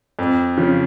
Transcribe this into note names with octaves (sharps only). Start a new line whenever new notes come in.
F2
C#3 F3